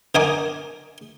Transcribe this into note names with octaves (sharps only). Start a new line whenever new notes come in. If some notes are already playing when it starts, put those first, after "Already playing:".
D3 A#4 D#5 G#5 D6